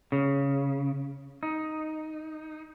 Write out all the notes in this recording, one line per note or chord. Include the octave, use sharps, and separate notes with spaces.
C#3
D#4